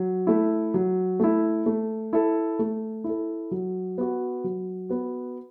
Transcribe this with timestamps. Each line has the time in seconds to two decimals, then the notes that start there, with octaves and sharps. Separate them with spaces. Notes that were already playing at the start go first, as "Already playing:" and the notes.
Already playing: F#3
0.27 A3 E4
0.74 F#3
1.20 A3 E4
1.66 A3
2.13 E4 A4
2.59 A3
3.04 E4 A4
3.51 F#3
3.98 B3 F#4
4.44 F#3
4.89 B3 F#4